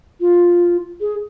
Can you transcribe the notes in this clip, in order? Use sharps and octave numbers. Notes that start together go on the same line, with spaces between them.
F4
G#4